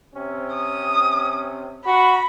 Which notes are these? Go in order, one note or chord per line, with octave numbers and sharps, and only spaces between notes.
C3 C4 C#4
D#6
F#4 B5